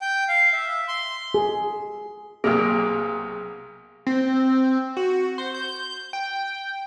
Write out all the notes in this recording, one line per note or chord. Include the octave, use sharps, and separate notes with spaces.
G5
F5
E5
C6
G#4
B1 C3 A#3 G#4
C4
F#4
C5
G6
G5